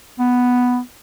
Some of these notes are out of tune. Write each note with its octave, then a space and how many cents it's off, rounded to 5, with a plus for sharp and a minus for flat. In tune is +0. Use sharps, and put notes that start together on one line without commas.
B3 +0